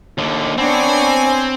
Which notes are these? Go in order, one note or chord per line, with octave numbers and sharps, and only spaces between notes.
D#2 D3
B3 C4 D4 C#5 G#5